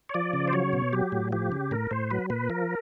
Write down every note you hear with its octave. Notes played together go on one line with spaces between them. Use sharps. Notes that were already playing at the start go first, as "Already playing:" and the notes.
C#5
F3 D5
C#3
C5
F#3 C#5
B2
F#3 G4
A2
F3 G4
C#3
A2 A#4
A2 C5
F#3 B4
A#2 B4
F3 A#4